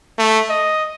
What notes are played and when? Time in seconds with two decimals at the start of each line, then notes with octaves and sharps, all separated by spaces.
0.18 A3
0.49 D#5